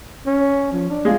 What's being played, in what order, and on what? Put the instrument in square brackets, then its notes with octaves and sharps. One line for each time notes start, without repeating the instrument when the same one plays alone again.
[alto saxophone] C#4
F3
D4
[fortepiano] G#3 F4